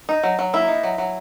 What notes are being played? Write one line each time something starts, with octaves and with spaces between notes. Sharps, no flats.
D#4
F#3
F#3
A#3 E4
D#4
F#3
F#3